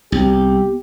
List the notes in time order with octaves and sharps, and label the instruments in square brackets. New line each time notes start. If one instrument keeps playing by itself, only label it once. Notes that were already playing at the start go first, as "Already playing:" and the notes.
[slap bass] C2 [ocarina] B3 [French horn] G4